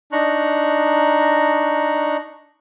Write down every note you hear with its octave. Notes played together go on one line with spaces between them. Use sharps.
D4 D#4 A#5 C#6 F#6